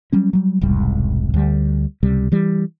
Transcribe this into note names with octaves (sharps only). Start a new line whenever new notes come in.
F#3 G3 C#4
F#3 G3
E1 C2 G#2 G3
D2 D3 G3
C#2 C3 G3
E3 G3